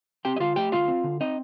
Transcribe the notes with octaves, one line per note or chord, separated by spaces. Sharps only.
C4 G4 G5
D#5
D3 F4 F5
A3 G4 G5
D2 F4 F5
C4
D3
C4 D#4 D#5